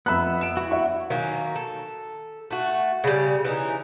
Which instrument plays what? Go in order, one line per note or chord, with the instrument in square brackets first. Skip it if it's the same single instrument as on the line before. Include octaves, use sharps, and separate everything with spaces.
[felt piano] F2 B5 F#6 [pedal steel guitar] B3 E5
[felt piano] D7 E7
[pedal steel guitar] E4 F#4
[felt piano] E5 F#5 C#6
[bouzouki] D#3 F#3 A#3 C#4
A4
A3 F#4
C#3 G3
E3 C#4 D#4